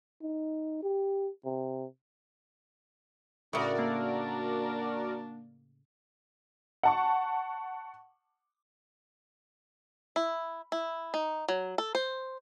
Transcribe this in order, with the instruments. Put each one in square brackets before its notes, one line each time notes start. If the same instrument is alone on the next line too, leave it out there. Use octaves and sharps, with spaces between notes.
[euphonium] D#4
G4
C3
[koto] A2 C#3 [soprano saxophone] D4 [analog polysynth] F#4 A#4 D5
[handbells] A#3
[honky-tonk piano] F#5 A5 C#6
[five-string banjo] E4
E4
D#4
F#3
A4
C5